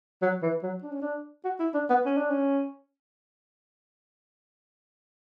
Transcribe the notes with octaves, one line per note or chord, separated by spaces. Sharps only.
F#3
E3
F#3
D4
C#4
D4
F#4
E4
D4
B3
C#4
D4
C#4